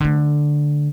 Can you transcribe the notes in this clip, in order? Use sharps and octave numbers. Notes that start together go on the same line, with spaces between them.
D3 A3